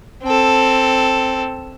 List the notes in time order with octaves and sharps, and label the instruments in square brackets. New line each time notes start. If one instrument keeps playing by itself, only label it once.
[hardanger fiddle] C4 A4